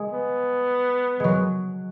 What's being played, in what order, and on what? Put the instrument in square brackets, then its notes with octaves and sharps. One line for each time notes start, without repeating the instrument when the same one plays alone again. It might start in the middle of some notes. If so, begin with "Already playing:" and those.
Already playing: [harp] G#3
[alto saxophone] B3
[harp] F#3 G#3